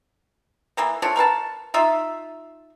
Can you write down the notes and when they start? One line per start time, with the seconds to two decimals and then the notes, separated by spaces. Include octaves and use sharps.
0.77 E3 A#3 B3
1.02 F3 A3 D4 C#5
1.16 A#4 B4 F5 A5
1.74 D#4 F4 E5